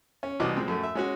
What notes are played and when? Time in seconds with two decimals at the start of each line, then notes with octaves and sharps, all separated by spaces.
0.23 C#4
0.40 C2 B2 E3 D#5 D6
0.56 A#2 G#3 C4
0.68 F#2 A3
0.83 E5
0.95 G#3 C#4 F#4